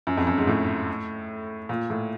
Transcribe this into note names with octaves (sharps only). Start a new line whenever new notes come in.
F#2
F2
F#2
G#2
A2
A#2
A2